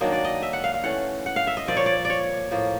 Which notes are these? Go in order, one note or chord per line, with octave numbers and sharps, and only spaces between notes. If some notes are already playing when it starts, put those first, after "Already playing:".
D#3 F#3 A#3 D4 D#5
D5
D#5
E5
F#5
F5
F5
E3 A3 C#4 F#5
F#5
F5
E5
D#5
A#2 F3 A#3 D5
C#5
D5
C#5 D5
A2 F3 A#3